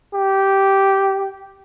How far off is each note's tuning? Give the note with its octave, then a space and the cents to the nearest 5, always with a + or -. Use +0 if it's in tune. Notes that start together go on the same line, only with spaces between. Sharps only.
G4 -10